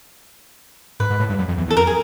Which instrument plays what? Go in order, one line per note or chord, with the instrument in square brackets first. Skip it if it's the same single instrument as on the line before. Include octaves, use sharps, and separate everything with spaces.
[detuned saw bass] G#2 [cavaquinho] B4
[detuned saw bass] G#2
A2
G2
F#2
F2
E2
E2
[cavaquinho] A4
[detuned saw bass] F2 [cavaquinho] A#4
[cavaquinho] G#4